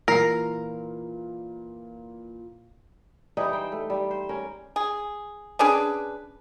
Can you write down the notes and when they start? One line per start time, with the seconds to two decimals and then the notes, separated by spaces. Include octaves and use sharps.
0.08 A#2 E3 A#4 C7
3.37 E3 G3 D#4 D#5
3.53 C5 G5
3.72 A3
3.90 G3
4.11 C5
4.29 C#4 A#4
4.76 G#4
5.59 C#4 D4 G#4 B4